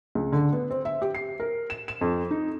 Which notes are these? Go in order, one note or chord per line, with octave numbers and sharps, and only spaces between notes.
C#2
D3
B3
C4
E5
G4
C7
A#4
E7
E7
F2
D#4